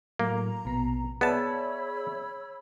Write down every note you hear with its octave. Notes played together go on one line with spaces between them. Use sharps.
A2 F#3 A#3 A#5
A#1 B2
B3 G#4 C#5 D5 E5 A5 B5 E6